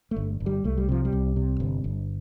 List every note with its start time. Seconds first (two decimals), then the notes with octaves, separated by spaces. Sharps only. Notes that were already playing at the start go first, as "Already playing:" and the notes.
0.11 A3
0.16 G1
0.40 G1
0.46 G3
0.64 C2 A3
0.78 G3
0.89 C3 F3
1.05 G3
1.13 C2
1.36 C3
1.60 G1
1.84 G1